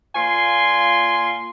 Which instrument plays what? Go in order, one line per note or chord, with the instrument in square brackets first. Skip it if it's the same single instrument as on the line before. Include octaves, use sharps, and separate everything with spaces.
[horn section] A#2 F4 G#5 C6